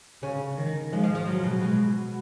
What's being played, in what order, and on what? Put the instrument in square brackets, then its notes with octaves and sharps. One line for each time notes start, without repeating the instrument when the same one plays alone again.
[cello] C#3 [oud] C#4
[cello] D#3
[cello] F3 [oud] G#3
[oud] F3
F3
[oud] C#3 [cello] F#3
[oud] B2
[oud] B2 [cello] G#3